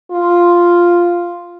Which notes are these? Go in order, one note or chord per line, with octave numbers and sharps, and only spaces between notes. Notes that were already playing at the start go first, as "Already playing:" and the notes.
F4